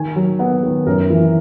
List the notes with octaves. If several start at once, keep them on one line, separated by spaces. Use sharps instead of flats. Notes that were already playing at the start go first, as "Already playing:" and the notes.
Already playing: D#3 G#5
F#3
B3 F#5
D#3
F#2 A#4
E3